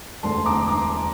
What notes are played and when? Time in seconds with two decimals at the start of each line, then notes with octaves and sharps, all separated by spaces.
0.23 E1 D2 D3 A3 A5 C6
0.45 A#5 D6
0.67 A#5 D6